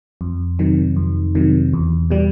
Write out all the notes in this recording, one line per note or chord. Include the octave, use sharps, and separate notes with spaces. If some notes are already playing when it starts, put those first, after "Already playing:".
F2
C3 D#3 F#3
F2
C3 D#3 F#3
E2
B2 G3